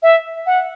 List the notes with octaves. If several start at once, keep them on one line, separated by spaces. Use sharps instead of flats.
E5
F#5